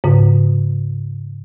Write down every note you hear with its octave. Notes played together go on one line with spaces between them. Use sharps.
G#2 C#3